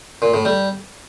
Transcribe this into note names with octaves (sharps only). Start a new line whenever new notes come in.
A#2
A2
G3